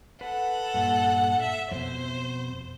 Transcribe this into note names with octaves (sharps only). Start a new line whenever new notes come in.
A4 B4 F#5
G2 A#2
E5
F2 B2 C5